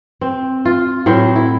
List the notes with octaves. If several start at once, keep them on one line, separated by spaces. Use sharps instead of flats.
C4
F4
A2 F#3 C4 C5
E4